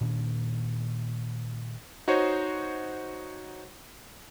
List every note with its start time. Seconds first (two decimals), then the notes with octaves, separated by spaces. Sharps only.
0.01 A#2 D#3 D4
2.08 D#4 F#4 C5 C#5 D#5